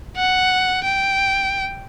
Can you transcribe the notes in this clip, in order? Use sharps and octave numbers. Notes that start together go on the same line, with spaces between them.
F#5
G5